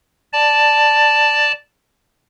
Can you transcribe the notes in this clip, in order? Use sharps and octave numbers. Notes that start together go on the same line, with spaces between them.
D5 A5